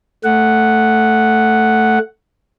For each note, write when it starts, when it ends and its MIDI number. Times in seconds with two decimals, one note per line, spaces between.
0.24 1.98 57
0.24 1.98 78